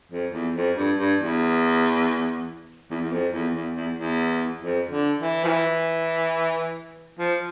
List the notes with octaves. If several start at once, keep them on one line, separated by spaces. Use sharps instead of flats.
F2
E2
F2
G2
G2
E2
E2
E2
F2
E2
E2
E2
E2
F2
D3
E3
F3
E3
F3